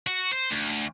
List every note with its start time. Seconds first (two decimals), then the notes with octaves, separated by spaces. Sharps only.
0.07 F#4
0.33 C5
0.50 D2